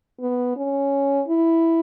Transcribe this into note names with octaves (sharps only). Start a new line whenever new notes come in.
B3
C#4
E4